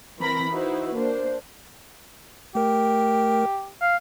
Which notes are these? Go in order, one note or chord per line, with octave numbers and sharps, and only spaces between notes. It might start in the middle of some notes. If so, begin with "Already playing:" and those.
E3 C4 A#4 B5 A#6
D#4 E4 F#4 B4 C5
A#3 D4 C5
A3 G4 A#4
F5